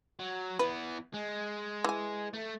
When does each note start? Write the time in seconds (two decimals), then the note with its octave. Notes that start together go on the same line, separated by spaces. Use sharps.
0.19 F#3
0.59 E3 B3 B4
1.14 G#3
1.84 E3 G#5
2.33 A3